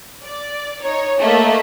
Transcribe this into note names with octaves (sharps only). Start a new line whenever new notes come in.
D5
D#4 C#5
A3 A#3 D#5 E5